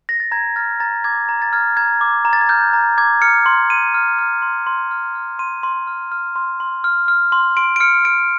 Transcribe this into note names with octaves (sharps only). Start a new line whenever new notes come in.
A#6
A6
A#5 G#6
F6 A6
A#5 A6
D6 G#6
A#5
A6
F6 G#6
A#5 G#6
D6
A#5
A6
G#6
F6 G6
A#5
D6 G#6
F6 C#7
C6
C6 D#7
F6
F6
C6
C6
F6
F6
C6 D#7
C6
F6
F6
C6
C6
F6
F6
C6
C6 D7
D7
F6 C#7
F6 D7